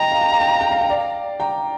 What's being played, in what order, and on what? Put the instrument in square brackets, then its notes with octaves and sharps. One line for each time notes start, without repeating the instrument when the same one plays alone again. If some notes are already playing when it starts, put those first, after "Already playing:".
Already playing: [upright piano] D#5 G5 [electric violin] A#5
[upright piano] F5
G5
F5
G5
F5
G5
F5
G5
D5 F5
G5 A#5